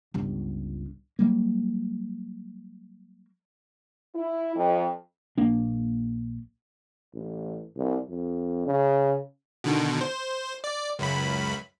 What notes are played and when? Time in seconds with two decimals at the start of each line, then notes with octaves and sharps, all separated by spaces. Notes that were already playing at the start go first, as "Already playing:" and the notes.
0.14 G1 C#2
1.19 F#3 G3 A#3
4.15 E4
4.56 F2
5.38 A#1 A#3 D4
7.14 A1
7.76 C2
8.09 F2
8.66 C#3
9.64 B2 D3 D#3
10.01 C5
10.64 D5
10.99 C#2 F#2 B5